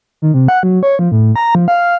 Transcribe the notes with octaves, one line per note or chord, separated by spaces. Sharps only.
D#3
C3
F#5
F#3
C#5
F3
A2
A#5
F3
F5